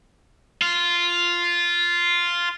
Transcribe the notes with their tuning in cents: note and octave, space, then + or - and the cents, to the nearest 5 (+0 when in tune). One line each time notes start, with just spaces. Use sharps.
F4 -5